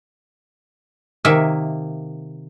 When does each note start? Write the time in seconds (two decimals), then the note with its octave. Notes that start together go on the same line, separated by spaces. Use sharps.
1.25 C3 D#3 A#3 E5 G#5